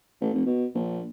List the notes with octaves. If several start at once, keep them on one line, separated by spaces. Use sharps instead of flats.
A1
F1
B2
A#1